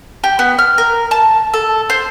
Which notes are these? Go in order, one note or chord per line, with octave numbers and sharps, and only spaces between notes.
G4
B3
F6
A#4
A5
A4
C5